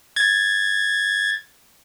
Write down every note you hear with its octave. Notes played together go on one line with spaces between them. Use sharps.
G#6 A6